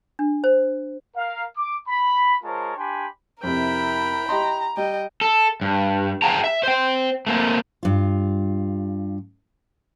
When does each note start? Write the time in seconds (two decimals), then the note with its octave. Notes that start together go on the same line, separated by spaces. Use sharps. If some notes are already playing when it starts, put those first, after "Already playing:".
0.19 D4
0.44 C5
1.16 A#4 F5
1.57 D6
1.89 B5
2.44 G#3 F4 A#4 C5 C#5 A5
2.77 D4 G4 G5 G#5 B5 C6
3.43 F2 C3 E4 A#4 G5 B5
4.29 G4 D#5 A#5 C6
4.77 G3 D#5 G5
5.21 A4
5.61 G2
6.22 G#4 F5 G5 A5 A#5
6.44 E5
6.63 C5 G5
7.27 A3 A#3 C4
7.83 G2 F4